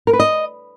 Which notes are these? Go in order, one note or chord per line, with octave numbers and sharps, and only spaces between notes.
A#4
B4
D#5